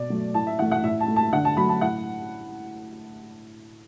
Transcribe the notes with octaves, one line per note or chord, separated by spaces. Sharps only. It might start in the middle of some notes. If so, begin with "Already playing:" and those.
Already playing: B2 D5
F#3 A3
A2 A5
E5
E3 A3 F#5
F#5
A2 E5
A5
A3
A5
D3 F#5
A5
F#3 A3 B5
A5
A2 F#5